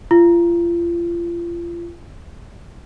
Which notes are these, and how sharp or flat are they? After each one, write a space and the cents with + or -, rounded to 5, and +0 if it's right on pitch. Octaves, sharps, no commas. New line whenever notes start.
F4 -35